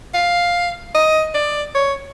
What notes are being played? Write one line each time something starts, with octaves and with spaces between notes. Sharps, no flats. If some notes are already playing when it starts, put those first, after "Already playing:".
F5
D#5
D5
C#5